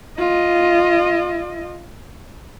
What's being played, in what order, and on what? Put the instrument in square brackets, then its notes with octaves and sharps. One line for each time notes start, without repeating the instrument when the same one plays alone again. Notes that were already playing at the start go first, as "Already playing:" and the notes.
[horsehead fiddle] F4 D#5